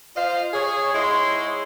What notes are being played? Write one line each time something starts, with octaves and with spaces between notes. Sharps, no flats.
F4 C5 D#5 F5
G#4 C#5
G#2 G#3 E4 C#5 D#5 C6